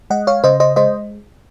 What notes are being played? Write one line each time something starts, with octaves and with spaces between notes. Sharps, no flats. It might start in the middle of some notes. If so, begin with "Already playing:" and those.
G#3 D#5 F#5
C#5 F5
C#3 C5 D#5
C5 D#5
G#3 C5 D#5